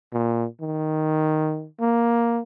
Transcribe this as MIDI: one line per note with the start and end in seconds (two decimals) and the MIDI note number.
0.13 0.46 46
0.61 1.67 51
1.80 2.41 58